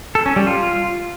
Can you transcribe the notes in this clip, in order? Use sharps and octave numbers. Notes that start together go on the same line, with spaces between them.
A4
C#4
G3
F4